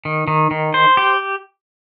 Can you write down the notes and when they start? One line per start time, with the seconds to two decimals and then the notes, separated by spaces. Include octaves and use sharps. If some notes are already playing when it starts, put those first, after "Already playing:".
0.05 D#3
0.28 D#3
0.51 D#3
0.74 C5
0.97 G4